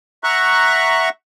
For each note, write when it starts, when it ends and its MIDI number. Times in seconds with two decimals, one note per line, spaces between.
0.24 1.09 76
0.24 1.09 78
0.24 1.09 82
0.24 1.09 85
0.24 1.09 90